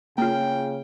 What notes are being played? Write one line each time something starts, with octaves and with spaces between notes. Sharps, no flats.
C#3 A#3 F4 G5